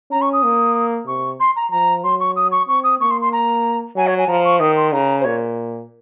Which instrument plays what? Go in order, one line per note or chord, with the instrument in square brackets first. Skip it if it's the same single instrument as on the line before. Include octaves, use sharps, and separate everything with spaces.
[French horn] C#4 [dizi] A#5
[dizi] C#6
D#6
[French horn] A#3
[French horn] C3 [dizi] C#6
[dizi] C6
A#5
[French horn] F3 [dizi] A#5
[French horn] F#3 [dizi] C6
[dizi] C#6
D#6
C#6
[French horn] C4 [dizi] C#6
[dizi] D#6
[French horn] A#3 [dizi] C#6
[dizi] C6
C6
A#5
[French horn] F#3 [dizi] G#5
[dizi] C#5
G#5
[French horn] F3 [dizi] A#5
[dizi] C#6
[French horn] D#3 [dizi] D#6
[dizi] C6
[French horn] C#3 [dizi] A#5
[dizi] C5
[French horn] A#2 [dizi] C#5